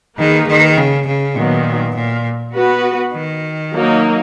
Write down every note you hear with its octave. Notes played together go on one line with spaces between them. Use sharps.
D#3 A#3 D#4 G#4 B4
D#3
C#3
C#3
A#2 D#3 F#3 B3
A#2
B3 F#4 B4
D#3
F#3 A#3 D#4